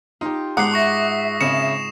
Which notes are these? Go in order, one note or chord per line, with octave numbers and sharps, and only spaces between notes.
D#4 F4 G4
G#2 F#5 A5 D6 D#6 F#6 C7
E5 C#6 A#6
G#1 C#3 C#7 E7